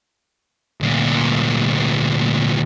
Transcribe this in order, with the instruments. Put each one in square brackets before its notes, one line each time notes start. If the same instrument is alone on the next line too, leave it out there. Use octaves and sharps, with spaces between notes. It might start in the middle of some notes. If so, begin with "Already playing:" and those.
[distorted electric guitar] D2 A#2